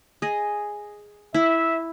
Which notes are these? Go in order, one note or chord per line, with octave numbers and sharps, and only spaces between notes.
G#4 D#5
E4 E5